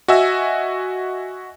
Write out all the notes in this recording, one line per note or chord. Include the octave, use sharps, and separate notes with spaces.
F#4 D#5 E5 G#5 E6